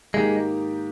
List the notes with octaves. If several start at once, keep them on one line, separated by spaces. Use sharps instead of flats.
G#2 D#3 G#3 A#3 D#4 G4